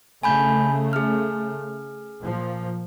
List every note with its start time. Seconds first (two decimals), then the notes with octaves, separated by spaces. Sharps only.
0.23 C#3 A3 G#5 B5 G6
0.93 G#4 F6
2.21 A#2 F3